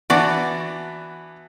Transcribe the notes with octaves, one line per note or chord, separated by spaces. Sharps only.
E3 B3 D4 F#4 D5